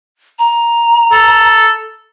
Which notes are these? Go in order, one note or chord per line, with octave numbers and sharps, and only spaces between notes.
A#5
A4